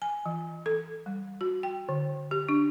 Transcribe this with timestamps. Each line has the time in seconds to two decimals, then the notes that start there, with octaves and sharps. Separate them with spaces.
0.02 G#5
0.26 E3
0.66 A4
1.06 G3
1.41 F#4
1.63 G5
1.89 D3
2.31 G4
2.49 D4